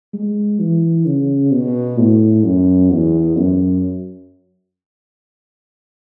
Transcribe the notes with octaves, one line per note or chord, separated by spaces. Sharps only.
G#3
E3
C#3
B2
A2
F#2
E2
F#2